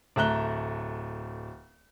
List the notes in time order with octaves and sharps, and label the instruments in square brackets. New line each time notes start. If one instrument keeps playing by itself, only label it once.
[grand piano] D1 A3 E5 A#5 F#6 G7